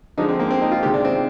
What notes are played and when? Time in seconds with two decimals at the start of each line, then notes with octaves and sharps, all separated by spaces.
0.18 D3 F3 G#3 D#4
0.29 C4
0.40 A#3
0.51 C4
0.62 D#4
0.71 F4
0.83 C3 D#3 G#3 G4
0.94 D4
1.05 C4